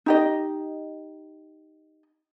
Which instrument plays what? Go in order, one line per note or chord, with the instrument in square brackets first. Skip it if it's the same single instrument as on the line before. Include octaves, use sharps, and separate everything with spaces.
[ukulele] D#4 G4 D#5